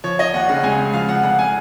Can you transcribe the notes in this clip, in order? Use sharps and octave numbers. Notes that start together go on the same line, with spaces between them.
F3 C#5
F3 D#5
D#2 F#5
C#3 F#5
C#2 G#5
C#2
F3 F5
C#2 F#5
F1 F#5
G#5